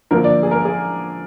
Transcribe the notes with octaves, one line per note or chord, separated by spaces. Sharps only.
D3 F3 A#3 A#4
D5
G#4
A#4
G#4